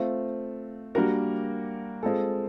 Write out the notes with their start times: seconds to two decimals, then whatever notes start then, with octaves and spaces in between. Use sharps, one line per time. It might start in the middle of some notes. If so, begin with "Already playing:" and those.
Already playing: A3 C4 F4
0.95 G3 A#3 D4 F#4 A#4
2.03 G#3 C4 F4 A4